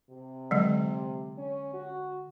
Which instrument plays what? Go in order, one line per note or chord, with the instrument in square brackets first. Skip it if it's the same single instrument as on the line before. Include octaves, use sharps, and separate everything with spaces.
[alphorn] C3
[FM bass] D3 [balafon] F#3 G#3
[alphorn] C#4
F#4